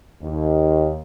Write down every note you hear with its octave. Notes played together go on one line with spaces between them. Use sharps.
D#2